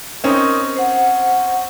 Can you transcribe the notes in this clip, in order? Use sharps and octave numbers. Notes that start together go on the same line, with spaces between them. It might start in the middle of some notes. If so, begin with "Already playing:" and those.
C4 C#4 D#4 A#4 D#6
C5 F#5